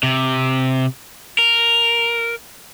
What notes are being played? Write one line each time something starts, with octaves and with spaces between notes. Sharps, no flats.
C3
A#4